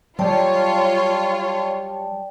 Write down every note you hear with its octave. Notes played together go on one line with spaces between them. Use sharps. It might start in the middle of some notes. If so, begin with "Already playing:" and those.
F#3 G3 F4 C#5 D5 G5 A5